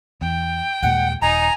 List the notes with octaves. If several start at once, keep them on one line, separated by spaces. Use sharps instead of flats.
E2 G5
D#2 A#2 G#3 F#5
D#1 D#4 G#5 A#5